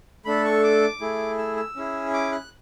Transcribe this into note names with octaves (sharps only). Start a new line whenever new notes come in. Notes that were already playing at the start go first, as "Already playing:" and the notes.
A3 D4 A4 B5
C#6
D6
A3 E4 G#4
E6
E6
C#4 E4 G#4
D6
F#6